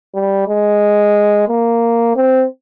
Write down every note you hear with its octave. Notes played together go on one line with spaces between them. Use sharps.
G3
G#3
A#3
C4